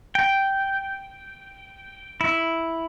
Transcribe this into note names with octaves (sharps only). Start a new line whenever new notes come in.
G5
E4